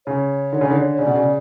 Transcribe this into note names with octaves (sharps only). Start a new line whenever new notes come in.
C#3 C#5
D3
C#3
D3
C#3 D5
B2
C#3